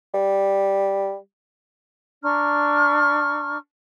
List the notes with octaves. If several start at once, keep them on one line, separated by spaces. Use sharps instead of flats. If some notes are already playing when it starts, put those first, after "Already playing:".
G3
D4 A#5 C#6 F6